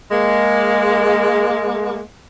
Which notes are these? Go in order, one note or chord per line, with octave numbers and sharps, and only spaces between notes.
G#3 A#3